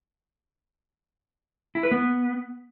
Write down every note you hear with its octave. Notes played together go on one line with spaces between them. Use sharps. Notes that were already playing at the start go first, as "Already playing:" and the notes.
E4
B4
B3